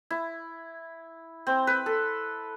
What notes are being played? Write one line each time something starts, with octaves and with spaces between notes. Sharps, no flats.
E4
C4
B4
A4